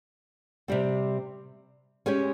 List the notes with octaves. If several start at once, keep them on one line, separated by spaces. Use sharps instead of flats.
C3 G3 C4
G#3 C#4 G4 C#5